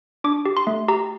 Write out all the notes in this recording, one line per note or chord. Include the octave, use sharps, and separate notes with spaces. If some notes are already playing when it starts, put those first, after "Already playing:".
D4 D6
G4
C6
A3
G4 A#5